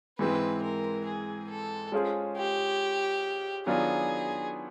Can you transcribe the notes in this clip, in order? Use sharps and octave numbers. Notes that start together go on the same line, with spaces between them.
G#2 E3 G#3 C4 B4
A#4
G#4
A4
G#3 C#4 F4 G#4 C5
G4
D#3 F#3 B3 D4 F4 G#4